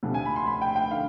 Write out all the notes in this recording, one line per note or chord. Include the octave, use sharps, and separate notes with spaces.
D2 C3 F3
G#5
B5
C6
B5
G5
G5
D3 F5